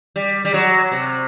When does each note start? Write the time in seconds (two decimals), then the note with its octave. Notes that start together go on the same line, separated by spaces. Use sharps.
0.16 G3
0.45 G3
0.54 F#3
0.92 C3